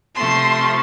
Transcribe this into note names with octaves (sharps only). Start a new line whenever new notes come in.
C3 F3 A3 C6